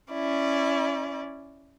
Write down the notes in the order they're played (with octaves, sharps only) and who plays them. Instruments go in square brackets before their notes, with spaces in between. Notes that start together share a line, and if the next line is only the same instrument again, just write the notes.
[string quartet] C#4 E4 D5